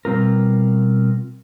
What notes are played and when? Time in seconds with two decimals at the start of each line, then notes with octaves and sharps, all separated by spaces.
0.05 B2 G3 C4 F4 A#4